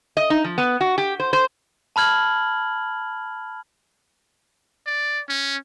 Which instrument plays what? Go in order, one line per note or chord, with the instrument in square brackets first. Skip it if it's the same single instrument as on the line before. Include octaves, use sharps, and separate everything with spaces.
[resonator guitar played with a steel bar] D#5
D#4
F3
B3
F#4
G4
C5
C5
[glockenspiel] A5 B5 F6 G#6 F#7
[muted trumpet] D5
C#4